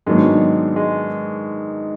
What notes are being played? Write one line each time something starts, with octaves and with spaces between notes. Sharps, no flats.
G#2 D#3 F#3 G#3 B3 D4
G#3